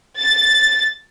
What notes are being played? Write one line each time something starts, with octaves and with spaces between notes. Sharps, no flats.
A6